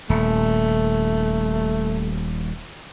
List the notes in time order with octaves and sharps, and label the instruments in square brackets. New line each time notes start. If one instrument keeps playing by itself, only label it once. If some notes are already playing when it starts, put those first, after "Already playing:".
[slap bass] D#1 [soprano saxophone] A3